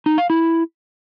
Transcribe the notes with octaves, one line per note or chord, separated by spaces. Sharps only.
D#4
F5
E4